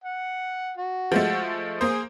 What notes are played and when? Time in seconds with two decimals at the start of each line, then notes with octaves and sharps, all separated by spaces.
0.04 F#5
0.77 F#4
1.12 F3 G#3 A3
1.81 A#3 G#4 C5 G#5 D#6